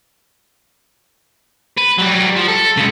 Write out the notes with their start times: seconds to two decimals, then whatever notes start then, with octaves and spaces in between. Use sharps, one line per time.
1.78 B4
1.99 F#3 G3
2.36 F3
2.49 A4
2.77 C#3 G#3